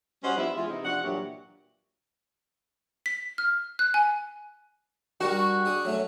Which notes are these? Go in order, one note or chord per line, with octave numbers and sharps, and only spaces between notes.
G3 C#4 F#4 C5 D#5 F#5
F3 B3 D4 E4 G4 E5
E3 G#3 E4 F4
C3 B3 C4 D#4 E4
C3 F3 D4 F#5
G2 A#2 E3 F#3 D4 G4
B6
F6
F#6
G#5
G3 D4 F#4 A#4
D4 G#4 G#5
F#3 A3 C#4